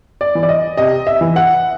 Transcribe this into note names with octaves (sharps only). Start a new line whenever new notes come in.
D5
E3
D5
D#5
C3 D#5
E5
E3
F#5